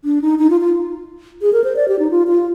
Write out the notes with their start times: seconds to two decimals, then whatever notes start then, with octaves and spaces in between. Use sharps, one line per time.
0.04 D4
0.22 D#4
0.39 D#4
0.50 F4
0.61 F4
1.42 G#4
1.53 A#4
1.64 C5
1.76 D5
1.88 G4
1.99 D#4
2.11 F4
2.27 F4